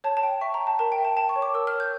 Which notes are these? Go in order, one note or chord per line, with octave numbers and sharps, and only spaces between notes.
C#5 A5
A5
G5
E5 C#6
A#5
G5
A5
A#4 A5
G5
E5
A5
G5 A5
C#6
C#5
D6
A#4 E6
F6
C#5
G6